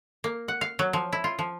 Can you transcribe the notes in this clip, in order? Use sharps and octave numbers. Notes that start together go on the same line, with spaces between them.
A#3
F#5
F5
F#3
F3
E4
F4
F3